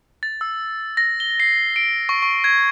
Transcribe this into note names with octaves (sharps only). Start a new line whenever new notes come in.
A6
E6
A#6
G7
C7
D7
C#6
C#6
G#6